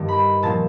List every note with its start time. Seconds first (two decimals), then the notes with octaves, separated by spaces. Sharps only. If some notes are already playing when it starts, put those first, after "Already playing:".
Already playing: G2 D#3
0.08 B5
0.43 A#2 F3 A5